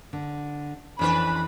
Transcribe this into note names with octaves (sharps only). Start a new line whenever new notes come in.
D3
F2 E3 C#4 D4 B4 B5